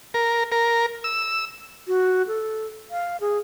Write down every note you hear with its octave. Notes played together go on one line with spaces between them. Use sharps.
A#4
A#4
E6
F#4
A4
F5
G#4